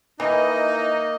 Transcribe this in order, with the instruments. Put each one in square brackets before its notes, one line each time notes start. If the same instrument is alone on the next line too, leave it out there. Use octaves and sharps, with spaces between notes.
[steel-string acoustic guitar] D#3 E4 [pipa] E3 [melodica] A#3 D#5 [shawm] D#4